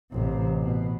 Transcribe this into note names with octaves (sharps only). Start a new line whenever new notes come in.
A1 C3
B2